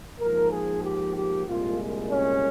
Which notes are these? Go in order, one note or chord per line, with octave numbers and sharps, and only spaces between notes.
G#2 F3 A#3 A#4
G#4
G4
G4
C2 A#2 G#3 F4
C#4